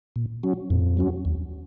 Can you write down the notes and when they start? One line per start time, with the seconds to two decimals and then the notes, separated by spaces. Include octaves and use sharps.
0.16 A#2
0.43 F#3 C#4 F#4
0.70 F2 A#2
0.97 F#3 C#4 F#4
1.25 D#2